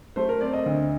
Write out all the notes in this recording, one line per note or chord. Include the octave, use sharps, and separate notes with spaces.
A3 C5
A#4
C4 D5
D#5
D2